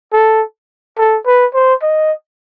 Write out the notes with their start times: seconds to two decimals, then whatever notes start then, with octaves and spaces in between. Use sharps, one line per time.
0.13 A4
0.98 A4
1.26 B4
1.54 C5
1.82 D#5